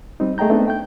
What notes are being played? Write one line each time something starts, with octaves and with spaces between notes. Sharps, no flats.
G3 C4 D#4
A3 G#4 D#5 G5 A#5 G6
A3 B3 C4 D4 D#4
G5 G6